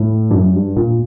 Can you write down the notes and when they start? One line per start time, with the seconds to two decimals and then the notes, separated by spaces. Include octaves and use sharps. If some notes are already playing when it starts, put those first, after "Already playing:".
Already playing: A2
0.31 G2
0.35 F#2
0.55 G2
0.77 A#2